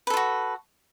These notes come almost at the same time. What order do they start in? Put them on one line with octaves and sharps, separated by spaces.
B4 A4 F4 F#4